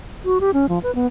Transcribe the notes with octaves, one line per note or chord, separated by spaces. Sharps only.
F#4
G4
C#4
F3
B4
B3